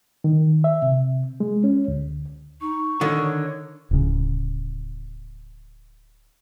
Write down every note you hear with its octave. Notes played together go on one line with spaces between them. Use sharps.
D#3
E5
C3
G#3
C#4
D2
D#4 C#6
D3 D#3 C#5
D1 C#3